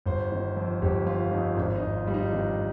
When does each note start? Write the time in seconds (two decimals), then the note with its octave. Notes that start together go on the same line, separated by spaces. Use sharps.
0.06 G1 C5
0.32 D#3
0.57 F2
0.82 G1 G4
1.06 F2 F4
1.31 F2 D#4
1.57 G#1 D4
1.76 D#4
1.83 G#1
1.95 F4
2.07 G3
2.14 D#4
2.32 D#3 D4